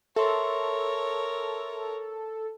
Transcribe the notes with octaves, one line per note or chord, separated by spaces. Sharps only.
A4 A#4 C#5 E5 C6